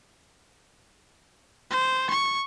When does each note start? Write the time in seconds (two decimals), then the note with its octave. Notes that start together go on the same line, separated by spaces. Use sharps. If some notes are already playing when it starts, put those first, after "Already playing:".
1.71 C5
2.10 C#6